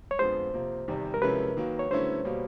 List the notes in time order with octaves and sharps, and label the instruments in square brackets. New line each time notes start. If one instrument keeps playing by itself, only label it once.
[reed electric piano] C#5
[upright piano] F2 D3 F3 G#3 B3 [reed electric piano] C5
[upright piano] C3 F3 A#3
E2 C3 D#3 G3
[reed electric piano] A#4
[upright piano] C3 F3 G#3 C#4 E4 [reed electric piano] B4
[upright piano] D#3 F#3 A#3
[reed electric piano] C#5
[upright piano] D3 F#3 A3 C#4 E4 [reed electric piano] C5
[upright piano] B2 G3 A#3